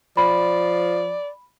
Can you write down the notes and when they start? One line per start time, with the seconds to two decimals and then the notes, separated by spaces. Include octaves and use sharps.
0.17 F3 D5 B5